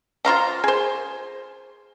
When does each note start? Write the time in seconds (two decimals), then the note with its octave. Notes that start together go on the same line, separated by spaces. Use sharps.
0.25 F4 C5 F5 A#5
0.64 G#4 C5